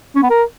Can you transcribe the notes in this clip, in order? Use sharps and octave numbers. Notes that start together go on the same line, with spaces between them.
C#4
B3
A#4